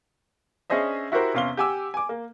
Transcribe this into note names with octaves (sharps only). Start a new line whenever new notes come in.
C#4 D4 G#4 C5 D#5 E5
E4 F#4 G4 A#4 C5
E2 C3 C#4 F5 C6 G7
G4 F#5 G#5 D6 E6
G#5 D6
A#3